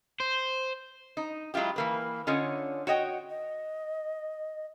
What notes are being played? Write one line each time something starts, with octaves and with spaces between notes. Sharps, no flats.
C5
D#4
F#3 G#3 E4 F4 G4
E3 A#3 B4
D3 C#4 F4 C#5 D#5
F#4 C#5 D#5 G5
D#5